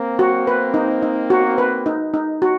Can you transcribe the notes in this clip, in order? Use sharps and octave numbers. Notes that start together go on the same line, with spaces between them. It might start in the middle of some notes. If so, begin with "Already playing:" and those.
Already playing: A#3 C4
F#4
B4
D#4
D#4
F#4
B4
D#4
D#4
F#4